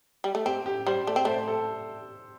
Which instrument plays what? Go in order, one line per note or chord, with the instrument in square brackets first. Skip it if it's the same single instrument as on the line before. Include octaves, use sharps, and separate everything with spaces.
[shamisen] G3
A3
[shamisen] C4 [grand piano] G4
[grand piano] G4
[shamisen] G3 [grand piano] C5
[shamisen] A3 [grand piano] D5
[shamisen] C4
[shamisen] A3 [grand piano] C5
[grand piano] A4